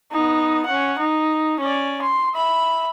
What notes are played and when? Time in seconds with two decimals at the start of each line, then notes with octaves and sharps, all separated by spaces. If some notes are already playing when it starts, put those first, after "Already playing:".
0.12 B3 D#4
0.66 C#4 F#5
0.98 D#4
1.60 C#4 D5
2.02 C6
2.35 E5 B5